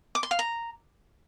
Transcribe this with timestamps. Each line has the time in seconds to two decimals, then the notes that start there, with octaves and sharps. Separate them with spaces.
0.15 D6
0.23 C6
0.31 F5
0.39 A#5